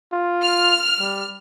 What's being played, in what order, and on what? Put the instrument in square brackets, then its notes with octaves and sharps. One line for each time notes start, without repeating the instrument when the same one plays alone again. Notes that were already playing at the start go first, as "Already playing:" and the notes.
[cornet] F4
[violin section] F6
[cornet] G3